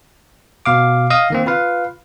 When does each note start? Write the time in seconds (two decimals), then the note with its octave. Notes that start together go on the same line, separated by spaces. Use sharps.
0.66 B2 F5 D6
1.10 D#5 F5 D#6
1.30 D#3 A#3 C4
1.46 F4 B4 F5